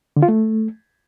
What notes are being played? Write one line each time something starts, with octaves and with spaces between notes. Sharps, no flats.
D3
F4
A3